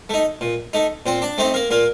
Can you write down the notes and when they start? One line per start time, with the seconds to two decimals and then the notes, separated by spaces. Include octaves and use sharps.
0.09 A3 D#4
0.41 A#2
0.73 A3 D#4
1.06 A#2 C4 C5
1.22 D4 D5
1.38 A3 C4 D#4 C5
1.54 A#3 A#4
1.70 A#2 A#3 A#4